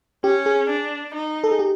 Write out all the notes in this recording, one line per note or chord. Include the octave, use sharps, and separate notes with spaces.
C#4 G4
G#4
D4
D#4
A4
G#4
G4